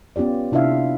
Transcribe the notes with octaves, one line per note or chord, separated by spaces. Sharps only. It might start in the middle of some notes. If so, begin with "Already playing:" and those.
B3 C#4 F4 G4 D5
C3 D4 E4 F4 E5 F5